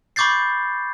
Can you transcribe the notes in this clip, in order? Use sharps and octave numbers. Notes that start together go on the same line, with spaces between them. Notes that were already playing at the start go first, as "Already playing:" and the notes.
B5 C#6 D6 G6 A6 C7